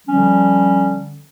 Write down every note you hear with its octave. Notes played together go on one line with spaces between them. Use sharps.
D3 F3 G3 C#4